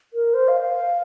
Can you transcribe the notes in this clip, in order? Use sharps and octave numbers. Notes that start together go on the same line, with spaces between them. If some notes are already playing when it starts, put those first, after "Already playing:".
A#4
C5
F5
F5